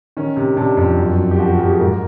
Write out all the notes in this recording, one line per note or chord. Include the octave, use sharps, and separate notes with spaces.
D#3 C#4
C3
C3 D4
F2
F#2
F#2
G4
F3 F#4
F#4
F#2 G4
G#4
G#2 A#4